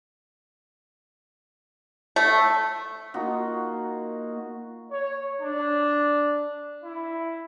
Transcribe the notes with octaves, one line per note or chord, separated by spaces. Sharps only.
A3
A#3 D#4 F4 F#4
C#5
D4
E4